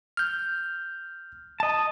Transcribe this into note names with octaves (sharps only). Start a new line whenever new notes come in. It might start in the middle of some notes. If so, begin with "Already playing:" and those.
F6 G6
D#5 A5